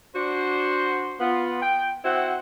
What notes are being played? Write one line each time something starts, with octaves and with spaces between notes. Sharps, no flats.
D4 F#4 C5
B3 F4
G5
C4 E4 F#4 C5 F#5